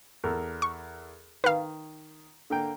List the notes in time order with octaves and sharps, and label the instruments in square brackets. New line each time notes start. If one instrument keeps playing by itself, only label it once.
[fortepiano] E2 A4 A#4
[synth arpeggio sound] C#6
[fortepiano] D#3 [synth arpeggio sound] B4 F5
[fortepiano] D3 A#3 G5